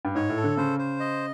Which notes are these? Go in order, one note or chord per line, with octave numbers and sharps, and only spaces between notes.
G2
G#2 C#5
A2
A4
D3
C#3 C5
C5
D#5